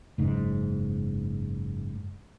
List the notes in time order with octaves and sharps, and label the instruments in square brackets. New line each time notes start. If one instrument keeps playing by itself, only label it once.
[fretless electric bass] F#1 G#2